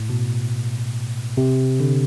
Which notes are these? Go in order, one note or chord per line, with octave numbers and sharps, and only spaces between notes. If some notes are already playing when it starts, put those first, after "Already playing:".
Already playing: A2
B2
C3
D3